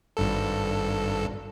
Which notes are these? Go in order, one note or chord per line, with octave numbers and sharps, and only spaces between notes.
G#1 G2 A4